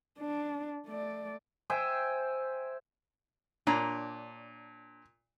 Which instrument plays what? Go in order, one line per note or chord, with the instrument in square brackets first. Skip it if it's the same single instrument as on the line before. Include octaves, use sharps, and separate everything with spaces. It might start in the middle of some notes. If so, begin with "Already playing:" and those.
[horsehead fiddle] D4
A3 D5
[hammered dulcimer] C5 E5 G5 G#5
[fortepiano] A#2 [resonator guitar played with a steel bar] D4 C#5 A#5